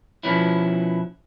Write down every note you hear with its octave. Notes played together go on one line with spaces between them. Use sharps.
B2 F3 B3 C#4 E4